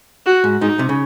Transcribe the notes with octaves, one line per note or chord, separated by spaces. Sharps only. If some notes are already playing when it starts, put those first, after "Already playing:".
F#4
G#2
G#2 D#4
C3
C#3